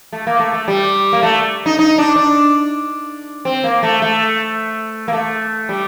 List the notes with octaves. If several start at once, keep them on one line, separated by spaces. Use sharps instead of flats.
A3
A#3
A3
A3
G3
A#3
A3
D#4
D#4
D4
D4
C4
A#3
A3
A3
A#3
A3
G3